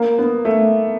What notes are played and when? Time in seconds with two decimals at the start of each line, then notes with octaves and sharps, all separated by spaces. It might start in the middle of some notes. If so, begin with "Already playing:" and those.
Already playing: A#3
0.18 B3
0.45 A3